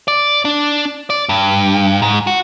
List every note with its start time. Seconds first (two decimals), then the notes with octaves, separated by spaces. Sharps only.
0.08 D5
0.45 D4
1.10 D5
1.29 G2
2.02 G#2
2.27 F#4